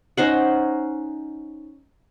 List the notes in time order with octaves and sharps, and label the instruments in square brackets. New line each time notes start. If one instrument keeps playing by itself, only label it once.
[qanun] C#4 D#4 C5 F#5